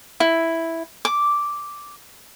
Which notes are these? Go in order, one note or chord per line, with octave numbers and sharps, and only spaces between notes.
E4
D6